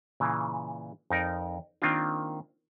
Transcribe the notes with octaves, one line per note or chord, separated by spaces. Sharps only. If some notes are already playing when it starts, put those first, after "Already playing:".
A#2 C#3 E3
F2 D#4 A#4 D5
D#3 A#3 C4 D4 F4